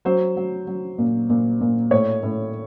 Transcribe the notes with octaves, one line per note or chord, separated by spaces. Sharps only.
F#3 C5
F#3
F#3
A#2
A#2
A#2
A2 C#5
A2